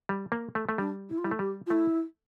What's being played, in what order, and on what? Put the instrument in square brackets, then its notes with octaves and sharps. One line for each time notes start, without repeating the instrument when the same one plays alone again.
[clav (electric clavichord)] G3
A#3
A3
A3
[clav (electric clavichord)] G3 [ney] D4
[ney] E4
F4
[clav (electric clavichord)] G3 [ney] E4
[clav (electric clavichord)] A3
[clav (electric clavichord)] G3 [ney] G4
[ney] F4
[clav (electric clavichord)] A3 [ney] E4